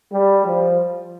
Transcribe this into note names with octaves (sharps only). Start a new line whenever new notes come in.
G3
F3